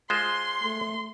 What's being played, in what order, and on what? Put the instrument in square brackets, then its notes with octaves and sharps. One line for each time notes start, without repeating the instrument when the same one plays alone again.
[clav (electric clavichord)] G#3 F4 C5 [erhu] C6
[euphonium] A3